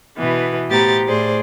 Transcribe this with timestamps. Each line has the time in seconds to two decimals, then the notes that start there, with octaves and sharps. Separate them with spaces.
0.17 B2 E3 B3
0.69 A2 B3 G4 C5 A#5 A6
1.06 A2 G#4 C5 D5